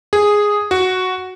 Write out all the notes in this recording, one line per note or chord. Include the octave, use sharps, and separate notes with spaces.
G#4
F#4